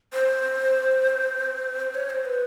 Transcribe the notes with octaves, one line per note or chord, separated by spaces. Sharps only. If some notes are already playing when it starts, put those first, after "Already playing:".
C5
C#5
C5
B4